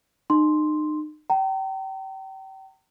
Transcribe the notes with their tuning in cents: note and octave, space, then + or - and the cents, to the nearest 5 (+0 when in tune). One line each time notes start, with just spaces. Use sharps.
D#4 -35 C6 +0
G5 -35 A#5 -35